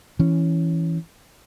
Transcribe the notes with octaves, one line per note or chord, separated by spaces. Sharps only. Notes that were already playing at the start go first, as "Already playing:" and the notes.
E3 C#4